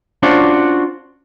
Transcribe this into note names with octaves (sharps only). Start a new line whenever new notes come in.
C#4 D4 F4 F#4 C5 D5